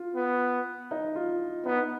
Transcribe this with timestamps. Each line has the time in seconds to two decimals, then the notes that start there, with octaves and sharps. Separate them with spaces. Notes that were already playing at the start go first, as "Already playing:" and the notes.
Already playing: F4
0.16 B3
0.91 D#4
1.16 F4
1.66 B3 D#4